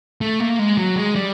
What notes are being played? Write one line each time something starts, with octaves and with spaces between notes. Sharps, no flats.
A3
A#3
G#3
F#3
G#3
G3